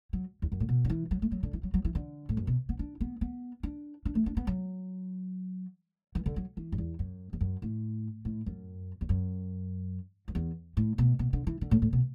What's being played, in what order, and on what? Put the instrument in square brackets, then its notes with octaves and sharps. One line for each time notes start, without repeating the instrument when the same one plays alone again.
[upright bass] F#3
E2
F#2
A2
B2
D3
E3
F#3
A3
F#3
D3
E3
F#3
F#3
E3
D3
A2
F#2
B2
B3
D4
B3
B3
D4
D4
A3
D4
B3
F#3
E3
D3
F#3
E3
F#2
E2
F#2
E2
F#2
A2
A2
F#2
E2
F#2
F#2
E2
A2
B2
B2
D3
E3
D3
A2
A2
B2